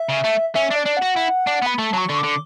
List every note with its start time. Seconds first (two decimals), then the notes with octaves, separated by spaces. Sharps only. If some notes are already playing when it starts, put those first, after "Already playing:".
Already playing: E5
0.09 C#3
0.24 A3
0.55 C#4 E5
0.71 D4
0.76 D5
0.85 D4
0.97 F#5
1.02 F#4
1.16 E4
1.47 D4
1.62 B3 B5
1.78 A3 A5
1.93 F#3 C#6
2.09 D3
2.18 D6
2.24 D3